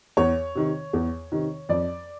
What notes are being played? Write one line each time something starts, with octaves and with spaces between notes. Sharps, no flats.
E2 C#5
C3 D#3
E2
C3 D#3
F2 D5